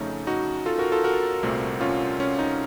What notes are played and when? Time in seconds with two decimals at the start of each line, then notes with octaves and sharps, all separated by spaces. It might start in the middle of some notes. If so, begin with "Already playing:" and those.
Already playing: F2 C#3 A3 C#4 D#4
0.27 D#4 F#4
0.66 F4 A4
0.79 F#4 A#4
0.92 F4 A4
1.04 F#4 A#4
1.43 C2 A#2 A3 C4
1.81 C#4 F4
2.20 C#4
2.39 D#4